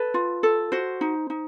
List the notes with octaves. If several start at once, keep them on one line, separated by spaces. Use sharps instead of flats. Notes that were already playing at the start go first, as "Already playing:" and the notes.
Already playing: A4 B4
F4
A4
F#4 C5
D#4
D#4